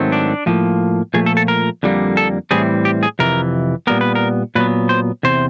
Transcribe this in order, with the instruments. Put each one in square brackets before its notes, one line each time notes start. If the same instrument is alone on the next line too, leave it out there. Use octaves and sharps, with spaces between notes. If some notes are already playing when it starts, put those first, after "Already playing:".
Already playing: [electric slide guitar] G#2 D#3 F#3 A3 C4
D4
A2 F3 A#3
A#2 F3 A3 G#4
A4
A4
A#4
F2 D3 G3 A#3
A4
A2 E3 G3 C4 G#4
G4
G#4
F2 C3 E3 A#4
A#2 G3 B3 A#4
B4
A#4
A#2 F#3 B3 B4
C5
E2 C3 C5